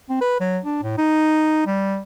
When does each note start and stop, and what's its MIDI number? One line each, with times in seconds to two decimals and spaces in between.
0.10 0.17 60
0.21 0.40 71
0.40 0.59 54
0.65 0.81 62
0.83 0.95 45
0.98 1.63 63
1.66 2.00 55